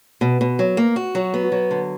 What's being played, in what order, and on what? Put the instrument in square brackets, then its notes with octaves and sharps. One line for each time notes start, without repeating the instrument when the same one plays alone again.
[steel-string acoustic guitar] B2
B2
F#3
A#3
F#4
F#3
B3
F#3
D3